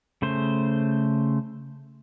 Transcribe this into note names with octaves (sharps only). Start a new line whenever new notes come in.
C#3 A3 C5